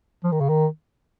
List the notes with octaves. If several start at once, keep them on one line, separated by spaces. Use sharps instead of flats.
F3
D#3
C#3
D#3